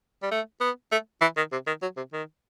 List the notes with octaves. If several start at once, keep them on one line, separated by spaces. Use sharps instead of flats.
G3
A3
B3
A3
E3
D#3
C3
D#3
F#3
C3
D#3